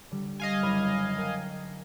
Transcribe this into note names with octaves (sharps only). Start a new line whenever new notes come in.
D3 G3
D#5 F5 G#5 C6
F#1 D5 B5
A#4 G5